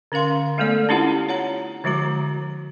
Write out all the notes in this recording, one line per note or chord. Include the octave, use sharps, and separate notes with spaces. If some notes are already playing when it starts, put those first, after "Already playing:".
D3 C#4 A#4 F5 C6
G#3 A3 B3 A4 D5
C#4 D4 E4 F4 G4 F#5
C#5 F#5 A#5
D3 F3 G#3 F#4 A#5